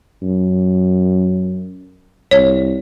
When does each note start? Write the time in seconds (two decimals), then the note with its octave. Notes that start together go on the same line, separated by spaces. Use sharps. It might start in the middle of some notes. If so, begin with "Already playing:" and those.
0.22 F#2
2.31 C2 C#5